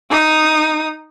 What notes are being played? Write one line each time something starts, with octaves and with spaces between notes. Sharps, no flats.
D#4 D#6